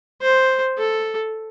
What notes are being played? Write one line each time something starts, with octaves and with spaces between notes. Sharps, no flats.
C5
A4